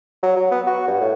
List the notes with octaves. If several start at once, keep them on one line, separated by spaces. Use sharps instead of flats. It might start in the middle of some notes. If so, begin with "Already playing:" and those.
F#3
F#3
B3
F#4
G2
A2